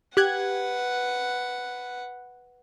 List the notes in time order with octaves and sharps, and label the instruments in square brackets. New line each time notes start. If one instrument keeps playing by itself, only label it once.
[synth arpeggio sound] G4 F#6 G#6 [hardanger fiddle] B4 F#5